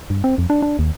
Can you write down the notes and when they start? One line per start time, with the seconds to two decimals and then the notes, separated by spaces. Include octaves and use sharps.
0.10 G2
0.24 C4
0.38 F2
0.50 D4
0.62 D4
0.79 D#2